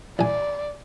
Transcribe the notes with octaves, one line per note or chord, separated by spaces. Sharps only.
A1 D5 G#5